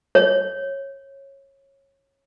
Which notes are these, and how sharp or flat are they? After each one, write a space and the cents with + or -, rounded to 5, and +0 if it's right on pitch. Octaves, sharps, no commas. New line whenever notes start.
C#5 -20